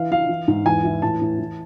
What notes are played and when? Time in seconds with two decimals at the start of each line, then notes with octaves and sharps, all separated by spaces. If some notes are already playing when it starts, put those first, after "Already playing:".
Already playing: E3 F5
0.11 E3 F5
0.29 E3
0.48 G#2
0.66 E2 G#5
0.84 E3
1.02 A2 A5
1.21 A2
1.39 E3